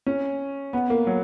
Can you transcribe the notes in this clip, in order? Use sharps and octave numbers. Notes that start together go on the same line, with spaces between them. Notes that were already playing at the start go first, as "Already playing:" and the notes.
C#4
B3
A#3
F#3